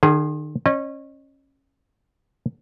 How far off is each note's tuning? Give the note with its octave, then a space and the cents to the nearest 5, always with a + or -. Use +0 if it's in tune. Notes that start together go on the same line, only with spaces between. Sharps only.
D#3 -45 G#4 +0
C#4 -20 D#5 -40